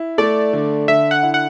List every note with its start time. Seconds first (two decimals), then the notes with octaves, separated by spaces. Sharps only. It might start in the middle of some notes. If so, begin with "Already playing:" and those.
Already playing: E4
0.18 A3 D5
0.53 D3
0.88 D3 E5
1.11 F#5
1.23 E4
1.34 F#5